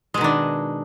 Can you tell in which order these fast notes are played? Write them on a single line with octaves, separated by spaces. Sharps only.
G#3 B2 D#3 D4